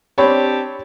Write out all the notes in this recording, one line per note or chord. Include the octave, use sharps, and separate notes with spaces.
C4 D4 G4 C#5 B5